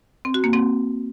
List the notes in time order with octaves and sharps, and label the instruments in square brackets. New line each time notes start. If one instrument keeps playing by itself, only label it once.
[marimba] C4
F#4
A#3
C4